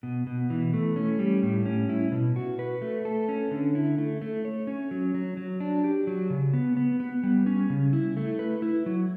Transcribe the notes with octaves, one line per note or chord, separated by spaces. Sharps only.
B2
B2
E3
A3
C#4
G3
A2
C#4
E4
B2
F#4
B4
A3
A4
C#4
D3
E4
A3
A3
C#5
C#4
F#3
F#3
F#3
D4
G4
F#3
C#3
B3
B3
B3
G3
C#4
C#3
E4
A3
B4
E4
F#3